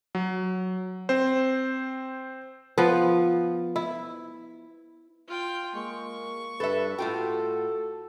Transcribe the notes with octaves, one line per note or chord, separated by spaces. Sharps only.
F#3
C4 C5
F3 B3
E4
F4 G5
G#3 A#3 C#6
G2 A4 B4 E5
A2 F4 F#4 A4 G5